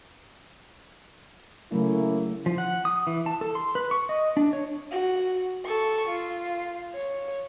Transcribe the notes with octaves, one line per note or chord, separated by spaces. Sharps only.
C#3 F#3 A3 A#3 C#4 E4
F3
F#5
D#6
E3
A5
A4
C6
B4
C#6
D#5
D4
C#5
F#4
A4 C#6
F4
C#5